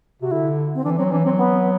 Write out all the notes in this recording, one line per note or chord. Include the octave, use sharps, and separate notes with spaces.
C3 F#4
D3 E4
C4
E3 D4
F#3 C4
E3 D4
F#3 C4
B3